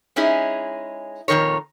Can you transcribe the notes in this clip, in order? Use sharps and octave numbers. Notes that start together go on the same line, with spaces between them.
G#3 C#4 D#4 E4 G#4
F2 A#2 D#3 A#4 C#5